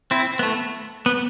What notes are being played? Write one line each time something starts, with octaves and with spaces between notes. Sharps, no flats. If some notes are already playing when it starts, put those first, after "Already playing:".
C4 E4
B3
A3
B3